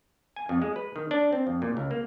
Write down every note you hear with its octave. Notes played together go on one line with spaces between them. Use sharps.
G#5
F2
G#3
B4
D#3
D4
C4
F2
A#2
C#2
A#3